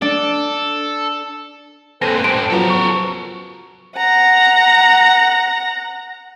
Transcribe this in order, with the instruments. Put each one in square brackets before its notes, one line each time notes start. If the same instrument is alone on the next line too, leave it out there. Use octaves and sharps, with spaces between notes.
[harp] D4 [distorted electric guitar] A4
[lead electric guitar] A#3 C4 [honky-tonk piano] A4 D#7 [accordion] B4 C5 G#5 [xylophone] A#6
[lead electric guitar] A2 G3 [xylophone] D7
[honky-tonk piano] F3 F#3 B3 [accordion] C#4 C#6 [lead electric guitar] A4 A#4
[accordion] C#4 [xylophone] C#6
[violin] F#5 A#5